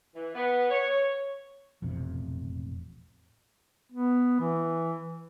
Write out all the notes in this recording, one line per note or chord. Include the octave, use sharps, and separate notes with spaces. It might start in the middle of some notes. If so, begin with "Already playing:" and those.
E3
B3
C#5
E1 A1 F2 C3
B3
E3